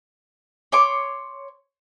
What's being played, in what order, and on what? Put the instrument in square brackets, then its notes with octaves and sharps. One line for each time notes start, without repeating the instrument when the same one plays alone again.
[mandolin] C#5 C6 D6